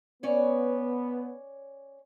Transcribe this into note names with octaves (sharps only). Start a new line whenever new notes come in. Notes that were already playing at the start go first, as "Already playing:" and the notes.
B3 C#4 C#5 D5